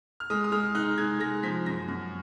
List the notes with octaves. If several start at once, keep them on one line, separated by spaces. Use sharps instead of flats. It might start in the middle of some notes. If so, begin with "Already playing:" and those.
F6
G#3 D#6
D#6
G#3 F6
D#4 F#6
G#3 G#6
G#3 A#6
F3 B6
F#2 A#6
F#2